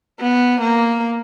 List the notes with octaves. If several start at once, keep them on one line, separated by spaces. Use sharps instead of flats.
B3
A#3